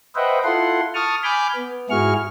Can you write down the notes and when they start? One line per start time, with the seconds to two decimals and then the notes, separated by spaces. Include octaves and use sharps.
0.15 B4 C5 D#5 E5 F#5 G5
0.44 E4 F4 A4 F#5 C6
0.94 A5 C#6 D#6 F6
1.23 G#5 B5 D6 F6 G6
1.55 B3
1.90 G#2 E4 F#4 G#4 C#6 F6